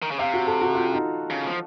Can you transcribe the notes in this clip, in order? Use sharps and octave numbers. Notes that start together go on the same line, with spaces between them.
D#3
C#3
C3 F5
F#4
A4
F#4
F4
D#4
C#3
F3